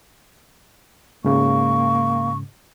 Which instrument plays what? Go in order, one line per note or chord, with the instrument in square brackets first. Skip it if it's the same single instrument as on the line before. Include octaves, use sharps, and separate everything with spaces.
[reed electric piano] G#2 C#3 [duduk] A#3 [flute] C#6